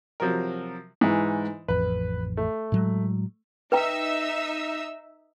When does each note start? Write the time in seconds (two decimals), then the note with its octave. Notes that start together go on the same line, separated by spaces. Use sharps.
0.20 C3 F3 F#3 F#4 A#4
1.01 G#2 E3
1.68 A1 F2 B4
2.37 A3
2.72 A2 F#3 G#3
3.72 D#4 B4 E5 G5 A#5 E6